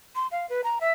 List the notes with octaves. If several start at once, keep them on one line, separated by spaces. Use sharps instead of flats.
C6
F5
B4
A#5
E5